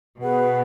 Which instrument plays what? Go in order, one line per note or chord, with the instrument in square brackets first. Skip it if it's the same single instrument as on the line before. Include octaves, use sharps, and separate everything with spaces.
[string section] B2 [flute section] G#4 B4 F#5